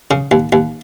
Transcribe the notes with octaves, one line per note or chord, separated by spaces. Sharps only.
C#3
D#2
D#2